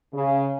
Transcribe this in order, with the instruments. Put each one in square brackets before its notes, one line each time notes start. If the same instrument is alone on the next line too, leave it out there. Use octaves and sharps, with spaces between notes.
[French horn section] C#3